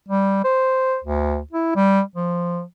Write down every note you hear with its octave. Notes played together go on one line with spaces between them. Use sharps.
G3
C5
D2
E4
G3
F3